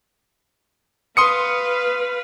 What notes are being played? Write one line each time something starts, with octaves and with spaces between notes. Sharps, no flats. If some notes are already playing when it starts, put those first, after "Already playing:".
B4 F5 C6 D#6 C#7